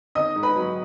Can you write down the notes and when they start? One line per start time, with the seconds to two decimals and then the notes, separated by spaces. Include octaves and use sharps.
0.15 D#3 D#5 D#6
0.36 G#2
0.43 B4 B5
0.56 F#3